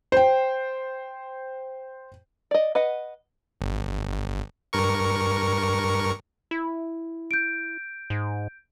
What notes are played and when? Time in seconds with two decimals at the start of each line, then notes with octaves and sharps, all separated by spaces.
0.12 C5 G5
2.51 D5 D#5
2.75 B4 D#5 F#5
3.61 G1
4.73 G2 A#4 C#6
6.51 E4
7.31 G6 D7
8.10 G#2